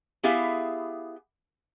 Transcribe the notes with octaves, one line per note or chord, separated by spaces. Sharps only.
B3 E4 G4 G#4 E5 F5